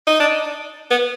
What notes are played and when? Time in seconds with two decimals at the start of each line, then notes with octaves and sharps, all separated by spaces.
0.07 D#4
0.20 D4
0.90 B3